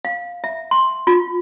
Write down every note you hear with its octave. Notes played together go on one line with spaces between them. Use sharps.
F5
E5
C6
F4